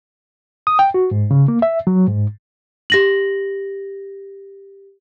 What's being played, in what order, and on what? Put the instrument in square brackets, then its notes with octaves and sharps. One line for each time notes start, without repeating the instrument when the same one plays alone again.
[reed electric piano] D#6
G5
F#4
G#2
C#3
A#3
E5
F#3
G#2
[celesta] G4 A#6 F#7